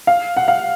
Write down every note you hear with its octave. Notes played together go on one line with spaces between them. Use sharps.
F5
F#5
F5